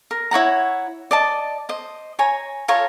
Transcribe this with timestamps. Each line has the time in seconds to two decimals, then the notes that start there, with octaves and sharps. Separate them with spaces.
0.11 A#4
0.31 E4 C#5 F#5 A#5
1.11 D5 D#5 A5
1.69 C5 D#5
2.19 C#5 G#5 A#5
2.68 F4 A4 C#5 A#5